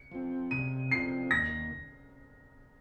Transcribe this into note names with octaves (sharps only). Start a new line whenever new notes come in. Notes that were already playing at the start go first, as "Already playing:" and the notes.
Already playing: C#7
F3 C4
C3 D#7
F3 C4 C7
D#2 A#6